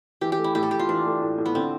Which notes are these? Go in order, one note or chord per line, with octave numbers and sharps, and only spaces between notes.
E3 G4
G4
A3
E4
A2 G4
A4
A2 G4
F4
E3 D4
A3
A2
A2
B3
D3 C4